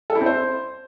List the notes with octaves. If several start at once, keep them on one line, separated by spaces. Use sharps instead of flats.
A4
E4
C4
C5